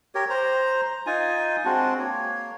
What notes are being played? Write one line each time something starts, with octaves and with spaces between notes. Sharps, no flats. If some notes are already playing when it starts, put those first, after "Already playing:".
G4 A#4 C#5
C5 A#5
D#4 F4 G#5
G#3 C4 D4 F#4
A#3 C#5